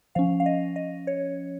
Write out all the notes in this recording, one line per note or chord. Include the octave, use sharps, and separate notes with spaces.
F3 C#4 F5
F5
D#5
D#5
C#5